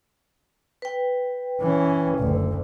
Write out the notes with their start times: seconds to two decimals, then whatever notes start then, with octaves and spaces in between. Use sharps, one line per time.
0.82 B4 G5
1.61 E3 C#4
2.18 F#1 D2